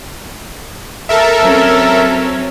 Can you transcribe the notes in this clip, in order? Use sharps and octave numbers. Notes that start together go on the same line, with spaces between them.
A4 A#4 E5
F#3 C4 C#4